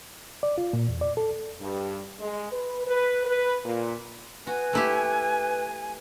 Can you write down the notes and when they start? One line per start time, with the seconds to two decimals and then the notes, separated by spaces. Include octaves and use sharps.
0.43 D5
0.58 F4
0.73 A#2
0.89 E2
1.01 D5
1.17 A4
1.60 G2
2.20 G#3
2.51 B4
2.86 B4
3.25 B4
3.64 A#2
4.47 F#4 B4 G#5
4.73 A3 E4 G4